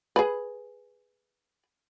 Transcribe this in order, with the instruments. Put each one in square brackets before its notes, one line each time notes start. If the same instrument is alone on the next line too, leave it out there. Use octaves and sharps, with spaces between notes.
[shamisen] G#4 B4